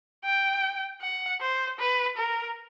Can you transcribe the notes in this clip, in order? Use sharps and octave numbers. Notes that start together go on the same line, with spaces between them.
G5
F#5
C5
B4
A#4